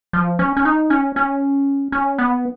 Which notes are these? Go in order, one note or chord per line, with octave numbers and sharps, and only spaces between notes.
F3
C#4
C#4
D#4
C#4
C#4
C#4
B3